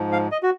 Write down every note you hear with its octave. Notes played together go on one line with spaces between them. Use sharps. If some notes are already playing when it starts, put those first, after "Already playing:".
Already playing: G#2 F3
F5
D#5
F#4